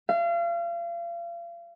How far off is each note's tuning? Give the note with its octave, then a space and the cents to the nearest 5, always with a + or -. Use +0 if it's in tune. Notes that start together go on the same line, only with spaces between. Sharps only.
F5 -35